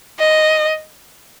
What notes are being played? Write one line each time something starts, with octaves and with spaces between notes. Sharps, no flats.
D#5